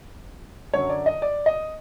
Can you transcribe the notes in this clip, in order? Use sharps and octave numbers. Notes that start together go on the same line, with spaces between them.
F#2 D3 F#3 C#5
D5
D#5
D5
D#5